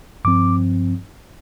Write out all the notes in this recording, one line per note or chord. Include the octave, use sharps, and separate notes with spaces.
G2 F3 C4 D6